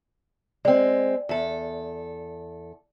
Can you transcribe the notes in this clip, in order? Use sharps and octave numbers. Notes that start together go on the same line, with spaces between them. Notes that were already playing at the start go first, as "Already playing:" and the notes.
G#3 C4 D5 G5
E2 A4